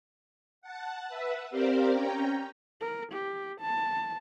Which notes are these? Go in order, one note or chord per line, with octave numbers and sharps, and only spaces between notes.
F#5 A5
B4 E5 F#5
C4 G4 A#4 C5 D5 F5
C#4 G5 A#5
A#4
G4
A5